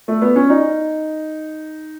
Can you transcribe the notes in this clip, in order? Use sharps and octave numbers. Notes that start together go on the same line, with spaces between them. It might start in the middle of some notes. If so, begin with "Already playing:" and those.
A3
B3
C#4
D#4